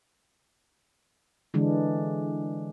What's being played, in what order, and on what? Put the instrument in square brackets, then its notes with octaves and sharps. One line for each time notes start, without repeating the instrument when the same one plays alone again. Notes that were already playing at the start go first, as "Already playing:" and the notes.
[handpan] D3 E3 G#3 D4